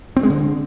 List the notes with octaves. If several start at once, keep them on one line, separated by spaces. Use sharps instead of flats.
C4
G#3
D3